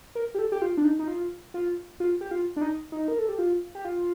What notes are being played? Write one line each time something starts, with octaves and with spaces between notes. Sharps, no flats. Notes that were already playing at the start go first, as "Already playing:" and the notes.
A#4
G4
A4
G4
F4
D4
D#4
D#4
F4
F4
F4
G4
F4
D4
D#4
D#4
A#4
A4
G4
F4
G4
F4